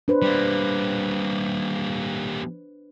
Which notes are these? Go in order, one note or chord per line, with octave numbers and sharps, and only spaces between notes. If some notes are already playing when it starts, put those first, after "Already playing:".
D4 B4 C5
G3 A#3